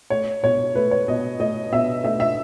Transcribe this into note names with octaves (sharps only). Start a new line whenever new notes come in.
A3 C#5
B2 C#5
A3 B4
C#5
B2 D#5
A3 D#5
B2 E5
A3 E5
E5